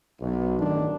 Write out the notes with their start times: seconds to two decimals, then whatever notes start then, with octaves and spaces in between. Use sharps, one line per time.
0.21 B1
0.59 A1 G2 D#3 D4